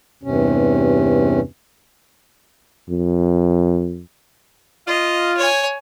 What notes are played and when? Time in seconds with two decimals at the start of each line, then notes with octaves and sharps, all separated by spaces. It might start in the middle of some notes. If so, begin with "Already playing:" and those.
0.23 E2 G2 C3 C#4
2.90 F2
4.87 F4 D#5
5.37 C#5 G#5